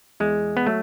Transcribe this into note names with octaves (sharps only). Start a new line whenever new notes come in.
E2 G#3
B3
F#3 A3